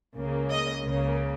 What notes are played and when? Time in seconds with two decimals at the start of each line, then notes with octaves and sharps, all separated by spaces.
0.16 C#2 C#3 A#3
0.51 D#5
0.84 C#2 C#3 A#3